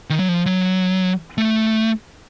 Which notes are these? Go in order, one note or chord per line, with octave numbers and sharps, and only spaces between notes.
D#3
F#3
F3
F#3
A3